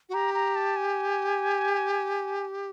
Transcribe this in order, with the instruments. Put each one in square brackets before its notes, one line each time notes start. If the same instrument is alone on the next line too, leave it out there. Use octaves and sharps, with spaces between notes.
[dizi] F#4
[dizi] G4 [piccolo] A#5
[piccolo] A#5
A5
G#5